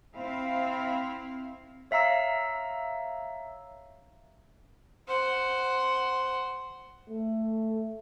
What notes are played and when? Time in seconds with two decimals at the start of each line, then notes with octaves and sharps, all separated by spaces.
0.15 C4 E4 F5
1.91 C#5 E5 F5 A#5 E6
5.08 C5 F#5
7.09 A3